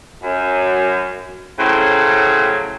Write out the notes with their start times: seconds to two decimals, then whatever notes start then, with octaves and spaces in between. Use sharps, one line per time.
0.23 F#2
1.60 A2 C#3 F#3 C5